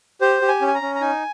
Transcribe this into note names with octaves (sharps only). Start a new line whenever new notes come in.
G4 C5
G4
G#5
C#4
G#5
A#5
C#4
A#5
D#4 G#5